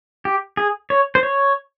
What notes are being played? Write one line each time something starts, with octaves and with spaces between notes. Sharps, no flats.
G4
G#4
C#5
C5
C#5